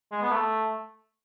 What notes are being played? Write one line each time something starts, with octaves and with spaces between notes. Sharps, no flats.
G#3
B3
A3